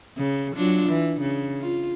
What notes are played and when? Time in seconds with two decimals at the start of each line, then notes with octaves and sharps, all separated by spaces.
0.18 C#3
0.56 F#3 D4 F4
0.89 E3
1.21 C#3
1.61 F4